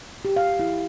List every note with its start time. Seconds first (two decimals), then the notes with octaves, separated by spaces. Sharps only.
0.25 G4
0.36 F5
0.59 E4